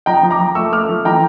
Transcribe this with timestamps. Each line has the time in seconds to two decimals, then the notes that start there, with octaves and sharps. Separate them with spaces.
0.06 F3 G5 A#5
0.23 F3
0.31 A#5 D6
0.40 F3
0.55 A3 C#6 E6
0.72 A3 D6 F6
0.89 F3
1.05 E3 G5 A#5